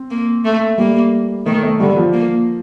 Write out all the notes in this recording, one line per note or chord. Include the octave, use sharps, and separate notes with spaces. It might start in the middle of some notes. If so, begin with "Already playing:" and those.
Already playing: C4
A#3
A3
G3 A#3
D#3 A3
A3
D3 G3
F3
A#3